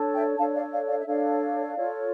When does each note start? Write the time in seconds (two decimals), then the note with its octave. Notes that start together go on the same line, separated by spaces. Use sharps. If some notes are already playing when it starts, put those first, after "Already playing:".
Already playing: D4 A4 C#5
0.14 E5 G5
0.37 D4 A4 C#5 F5 A5
0.55 D5 F5
0.72 D5 F5
0.89 D5 F5
1.00 E5
1.06 D4 A4 C#5 D5 F5
1.76 F4 A4 C#5